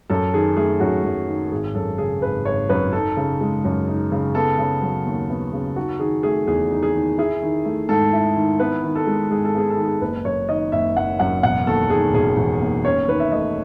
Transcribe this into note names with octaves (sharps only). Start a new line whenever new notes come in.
F#2 A4
D#3 G#4
A3 G#4
F#2 F#4
F#2
D#3
G#1 G#4
F#2 A4
C#3 G#4
G#1 B4
G#1 C#5
F#2 B4
D#4 A4
C#3
G#3
F#2
D#4
C#3
B3 A4
C#3
F#3
D#2
B3
C#3
D#4 F#4
D#3 G#4
A3 G#4
E2 G#4
D#4
G#4
D#3
E4 G#4
D#3
A3
G#2 A4
E4
D#3
B3 B4
D#3
A4
G#3
G#2 G#4
A4
B3 G#4
A4
D#3
G#4
F#1 B4
F#2 C#5
D#3 D#5
F#1 E5
F#1 F#5
F#2 F#5
E1 F#5
D#2 A4
D#3 G#4
E1 G#4
E1
D#2
C#4 C#5
D#3 B4
E5
A3 D#5